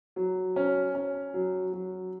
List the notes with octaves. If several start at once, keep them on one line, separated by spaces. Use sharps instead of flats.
F#3
C#4
C#4
F#3
F#3